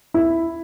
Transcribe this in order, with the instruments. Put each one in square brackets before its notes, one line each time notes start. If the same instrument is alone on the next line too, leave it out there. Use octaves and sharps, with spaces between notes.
[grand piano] E4